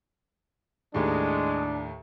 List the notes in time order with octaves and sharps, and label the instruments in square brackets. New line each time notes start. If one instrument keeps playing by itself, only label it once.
[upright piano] D#2 A2 [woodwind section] G#3 [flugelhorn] D4